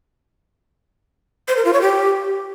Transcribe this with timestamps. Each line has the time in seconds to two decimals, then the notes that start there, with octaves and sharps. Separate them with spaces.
1.48 C5
1.57 A#4
1.65 F4
1.73 C#5
1.82 G4